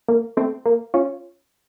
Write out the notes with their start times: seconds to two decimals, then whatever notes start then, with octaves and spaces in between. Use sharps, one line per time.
0.08 A#3
0.37 A3 C4
0.66 A#3
0.94 C#4 F4